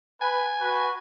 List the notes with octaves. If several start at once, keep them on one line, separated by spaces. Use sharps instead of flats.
B4 G#5
F#4 B4